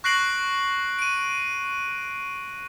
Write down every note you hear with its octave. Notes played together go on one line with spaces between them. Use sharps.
C#6 F#6 A#6 C7 D7 F#7
D7 D#7